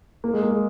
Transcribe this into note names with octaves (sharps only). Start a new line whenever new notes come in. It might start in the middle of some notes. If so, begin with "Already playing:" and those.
A#3
G#3
A#3
G#3